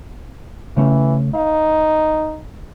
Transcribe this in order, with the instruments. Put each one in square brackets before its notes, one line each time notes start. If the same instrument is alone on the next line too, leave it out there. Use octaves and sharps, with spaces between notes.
[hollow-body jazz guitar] C#3 A3 C#4 [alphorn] E3
[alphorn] D#4 [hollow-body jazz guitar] F5